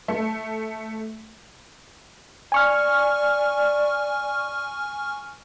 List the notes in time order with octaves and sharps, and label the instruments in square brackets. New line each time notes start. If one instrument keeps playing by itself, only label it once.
[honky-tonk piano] A3
[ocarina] D5 [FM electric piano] G#5 C#6 F6